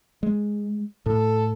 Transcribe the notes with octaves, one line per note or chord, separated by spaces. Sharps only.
G#3
A2 A4